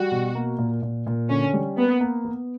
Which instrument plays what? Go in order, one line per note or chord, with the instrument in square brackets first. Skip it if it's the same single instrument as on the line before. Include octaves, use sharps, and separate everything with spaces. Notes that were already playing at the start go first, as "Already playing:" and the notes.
Already playing: [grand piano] G3 [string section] F#4
[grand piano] B2
A#3
A#2
A#2
A#2
[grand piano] D3 [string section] C#4
[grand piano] G3
[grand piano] A#3 [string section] B3
[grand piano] A#3
B3